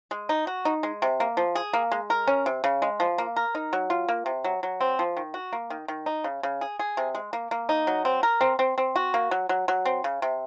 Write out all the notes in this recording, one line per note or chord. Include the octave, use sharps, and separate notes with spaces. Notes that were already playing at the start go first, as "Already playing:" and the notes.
G#3
D#4
F#4
D#4
G#3
C3
A#3
F3
G#4
A#3
G#3
A#4
C#4
C3
C#3
G#3
F3
A#3
A#4
D#4
F#3
F4
A#3
C3
F#3
F#3
C4
F3
D#3
F#4
A#3
D#3
D#3
D#4
C#3
C#3
G#4
G#4
C3
G#3
A#3
A#3
D#4
F#3
C4
A#4
C4
C4
C4
F#4
A#3
F#3
F#3
F#3
C4
C#3
C3